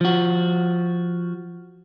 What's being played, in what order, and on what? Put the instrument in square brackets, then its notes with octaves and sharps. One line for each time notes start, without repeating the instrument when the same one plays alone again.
[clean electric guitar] F3 F#4